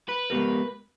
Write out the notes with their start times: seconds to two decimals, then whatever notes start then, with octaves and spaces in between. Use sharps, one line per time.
0.09 B4
0.30 G#3 B3 G4 A#4